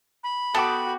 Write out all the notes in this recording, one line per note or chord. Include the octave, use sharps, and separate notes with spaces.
B5
B3 F#4 A4 G5 A5 D6